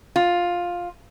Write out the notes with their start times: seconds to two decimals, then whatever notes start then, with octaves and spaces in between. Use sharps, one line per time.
0.16 F4